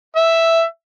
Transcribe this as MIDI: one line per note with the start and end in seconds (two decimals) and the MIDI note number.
0.16 0.63 76